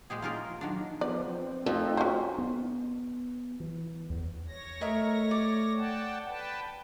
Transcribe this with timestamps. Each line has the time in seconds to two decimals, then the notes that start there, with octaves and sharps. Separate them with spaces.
0.10 A#2 G#3 G4 G#4
0.22 A#3 C#4 F4 G4 G#4 A#4
0.61 D#3 F#3 D4
1.01 F3 B3 D5
1.29 C4
1.66 F2 A3 D#4 A4
1.97 C#4 F#4 C5
2.38 B3
3.60 E3
4.10 E2
4.48 C#5 A#6
4.81 A3 A#4 D#5 E5
5.31 D5
5.77 F#5 G5 A5
6.27 B4 G5 A5